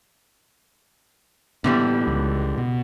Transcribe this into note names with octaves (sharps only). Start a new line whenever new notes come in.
A2 D3 E3 G3 A#3 B3
C#2
B2